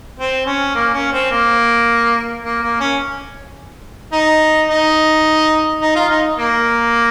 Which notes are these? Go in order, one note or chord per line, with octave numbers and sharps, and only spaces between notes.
C4
C#4
A#3
C#4
C4
A#3
A#3
A#3
C#4
D#4
D#4
D#4
F4
D#4
A#3